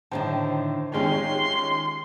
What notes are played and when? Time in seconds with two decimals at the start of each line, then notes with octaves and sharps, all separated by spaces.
0.11 A2 D3 D#3 C5 G5 A5
0.94 D#3 G#3 C#4 F4 G4 G5 C6